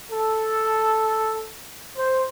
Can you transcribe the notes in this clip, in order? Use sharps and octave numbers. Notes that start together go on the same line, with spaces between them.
A4
C5